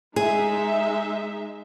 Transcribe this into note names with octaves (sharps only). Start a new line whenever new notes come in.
G#3 D#4 G#4 E5